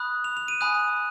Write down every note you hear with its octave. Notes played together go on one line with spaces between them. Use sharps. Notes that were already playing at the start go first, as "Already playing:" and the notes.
Already playing: B5 D#6 F#6
F7
F7
D#7
G#5 B5 D#6 F#6